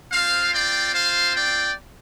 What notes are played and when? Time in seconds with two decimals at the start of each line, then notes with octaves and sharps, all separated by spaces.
0.11 C4 F4 C5 F5
0.52 D5 G5
0.94 C5 F5
1.35 D5 G5